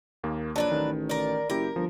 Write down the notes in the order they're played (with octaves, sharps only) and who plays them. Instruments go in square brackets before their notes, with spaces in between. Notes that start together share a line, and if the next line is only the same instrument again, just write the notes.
[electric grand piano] D#2 A#3
[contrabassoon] A#1 [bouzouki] F#3 D4 B4 [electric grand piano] A5
[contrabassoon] A1 [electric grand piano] D#3
[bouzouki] A#4 D5
[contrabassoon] F#1 [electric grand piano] E4 G4 [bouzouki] A#4
[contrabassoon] G1 [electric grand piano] F3